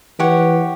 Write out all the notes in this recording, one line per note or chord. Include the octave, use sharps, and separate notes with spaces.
E3 G4 C#5 F#5